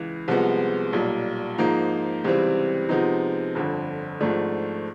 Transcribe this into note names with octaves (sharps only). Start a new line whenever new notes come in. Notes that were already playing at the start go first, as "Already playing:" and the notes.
Already playing: C#2 E3
C2 C3 F3 G#3 B3
B1 A#2 G3
G#2 F3 A#3 D#4
C#2 C3 E3 G3 C4
C3 F3 G#3 B3 D#4
G1 F2 D3
G#1 G#2 F3 A3 D4